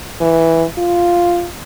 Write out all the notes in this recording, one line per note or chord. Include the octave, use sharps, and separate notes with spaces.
E3
F4